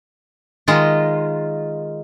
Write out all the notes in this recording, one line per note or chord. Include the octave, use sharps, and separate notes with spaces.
D#3 G#3 F4 D#5